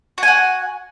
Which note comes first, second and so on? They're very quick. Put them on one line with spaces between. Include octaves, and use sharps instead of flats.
F#4 G#5 F#5